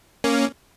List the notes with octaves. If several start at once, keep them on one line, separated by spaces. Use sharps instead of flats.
A#3 C#4